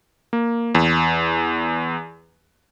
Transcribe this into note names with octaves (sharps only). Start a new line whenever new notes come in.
A#3
E2